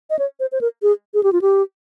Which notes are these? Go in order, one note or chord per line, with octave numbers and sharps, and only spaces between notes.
D#5
C#5
C5
C5
A#4
G#4
G#4
G4
F4
G4